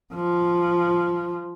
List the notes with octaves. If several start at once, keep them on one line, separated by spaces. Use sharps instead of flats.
F3